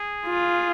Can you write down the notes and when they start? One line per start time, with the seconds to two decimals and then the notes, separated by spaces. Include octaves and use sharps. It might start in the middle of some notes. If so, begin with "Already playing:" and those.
Already playing: G#4
0.27 F4